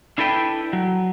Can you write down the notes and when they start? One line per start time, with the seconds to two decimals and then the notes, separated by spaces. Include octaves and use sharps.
0.18 D4 E4 A4 B4 G5
0.73 F#3